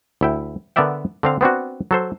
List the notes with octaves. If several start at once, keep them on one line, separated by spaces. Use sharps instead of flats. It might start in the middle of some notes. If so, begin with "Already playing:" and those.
D2 E4 G5
D3 B3 A#4 D5 E5 G5
D3 C4 F5
B3 C4 D4 F#4
F#3 A4 C5